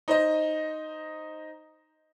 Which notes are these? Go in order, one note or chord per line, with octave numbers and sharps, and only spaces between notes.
D#4 C5 D#5